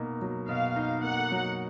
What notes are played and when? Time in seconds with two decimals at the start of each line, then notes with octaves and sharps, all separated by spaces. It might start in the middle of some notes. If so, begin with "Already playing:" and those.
Already playing: B2 A#3 D#4
0.22 F#3
0.48 B2 F5
0.76 D#4
1.03 A#3 F#5
1.32 F#3